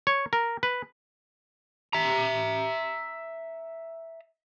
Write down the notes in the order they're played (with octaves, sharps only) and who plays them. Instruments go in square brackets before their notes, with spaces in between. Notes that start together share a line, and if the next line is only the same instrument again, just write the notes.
[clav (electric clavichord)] C#5
A#4
B4
[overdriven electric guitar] E5 A#5